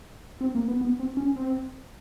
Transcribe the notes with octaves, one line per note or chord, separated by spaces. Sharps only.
C4
A#3
B3
B3
C4
C#4
C4